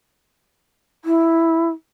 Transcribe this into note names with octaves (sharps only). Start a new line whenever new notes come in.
E4